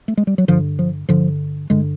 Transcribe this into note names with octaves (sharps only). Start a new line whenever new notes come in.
A3
G#3
G3
F#3
G2 D3 F3
F3
G2 D3 F3
G2 D3 G#3